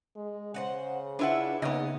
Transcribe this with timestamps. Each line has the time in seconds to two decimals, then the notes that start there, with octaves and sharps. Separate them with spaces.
0.16 G#3
0.54 C#3 C5 D#5 F#5
1.19 D4 E4 F4 B4 E5 F#5
1.62 C#3 A#3 B3 D#4 D#5